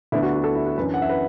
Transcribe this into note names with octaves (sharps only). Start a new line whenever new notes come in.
D2 D3 B3 D4 E4
F#4
F#4
A4
E4
F#4
F#2 E3 D4 B4
F#5
E5
B4